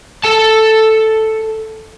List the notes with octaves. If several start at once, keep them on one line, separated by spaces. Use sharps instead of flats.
A4 A5